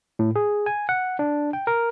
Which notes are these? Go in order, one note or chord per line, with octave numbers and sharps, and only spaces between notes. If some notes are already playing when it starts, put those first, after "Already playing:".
A2
G#4
G#5
F#5
D4
G5
A#4